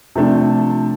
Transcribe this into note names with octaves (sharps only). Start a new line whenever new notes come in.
C3 F3 A3 D4